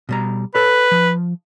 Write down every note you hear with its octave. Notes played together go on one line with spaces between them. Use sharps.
B2 G3 A#5
A4 B4 C#5
F3